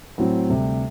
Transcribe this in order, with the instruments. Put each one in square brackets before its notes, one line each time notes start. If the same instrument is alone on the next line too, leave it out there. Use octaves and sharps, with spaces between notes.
[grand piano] A2 F#3 C4
D2 C3 G3